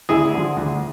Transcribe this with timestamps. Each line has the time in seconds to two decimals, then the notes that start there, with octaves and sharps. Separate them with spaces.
0.09 D2 E4 G#4
0.34 D3 F3
0.56 D2